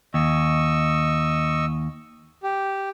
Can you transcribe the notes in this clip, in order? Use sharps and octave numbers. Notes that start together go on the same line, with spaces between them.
D#2 D#5 C#6 E6
G4